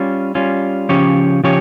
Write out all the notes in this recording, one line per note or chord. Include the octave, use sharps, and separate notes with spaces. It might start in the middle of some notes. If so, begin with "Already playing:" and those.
Already playing: G3 C#4 F4
G3 C#4 F4
C#3 F3 C#4 G4 C#5
C#3 F3 C#4 G4 C#5